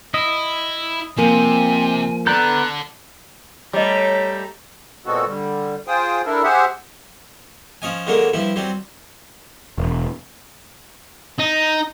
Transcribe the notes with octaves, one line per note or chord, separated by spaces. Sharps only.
E4 D#5
C3 F3 A#3 G#5
B3 A4 D5 A#5 F#6 G6
G3 A3 C#5 D#5 A#5 D6
A#2 G#3 B3 C4 F#4 A4
D3 G3
F4 G#4 C5 G5 D#6
D4 E4 A4 A#4
G4 G#4 C5 E5 F#5
F3 C#4 D#5 G#5
D3 D#3 F#3 G#3 A#3
G2 F3 E4
F#3 G3 C4
E1
D#4